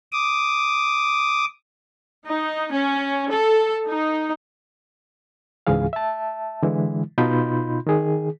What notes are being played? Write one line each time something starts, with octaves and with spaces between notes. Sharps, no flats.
D6 D#6
D#4
C#4
A4
D#4
C#2 G#2 E3 G#4 F5
E5 A5
D3 E3 G#3 E4
B2 D#4 F4 B5 C6 G6
D#3 G#4